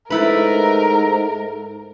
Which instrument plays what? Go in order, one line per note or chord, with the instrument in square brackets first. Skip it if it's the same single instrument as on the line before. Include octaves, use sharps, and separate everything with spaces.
[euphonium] G#2 [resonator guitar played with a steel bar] A3 E4 B4 [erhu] A#4